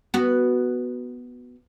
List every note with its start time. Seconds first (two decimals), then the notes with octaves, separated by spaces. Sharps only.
0.14 B3 F#4